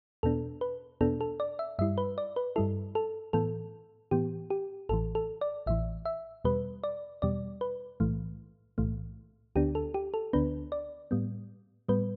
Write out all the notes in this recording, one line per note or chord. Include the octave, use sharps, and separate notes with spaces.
E2 B2 B3 D4 A4
B4
E2 B2 B3 D4 A4
A4
D5
E5
G2 G3 E4 E5
B4
D5
B4
G2 G3 E4 A4
A4
A2 E3 B3 A4
A2 E3 B3 G4
G4
A1 A2 E3 A4
A4
D5
A1 A2 E3 E5
E5
E2 B2 G3 B4
D5
E2 B2 G3 D5
B4
B1 A2 E3 A3
B1 A2 E3 A3
D2 D3 B3 D4 G4
A4
G4
A4
D2 D3 B3 D4 B4
D5
A2 G3 B3
A2 G3 B3 B4